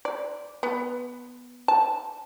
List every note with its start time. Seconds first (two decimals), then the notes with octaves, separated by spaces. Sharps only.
0.05 D5
0.63 B3
1.68 A5